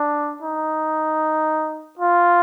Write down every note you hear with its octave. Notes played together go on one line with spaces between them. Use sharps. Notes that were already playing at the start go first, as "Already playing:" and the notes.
Already playing: D4
D#4
F4